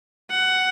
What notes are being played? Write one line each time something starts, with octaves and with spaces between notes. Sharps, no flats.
F#5